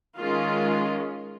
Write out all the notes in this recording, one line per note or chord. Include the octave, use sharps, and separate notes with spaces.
D#3 G#3 C#4 F4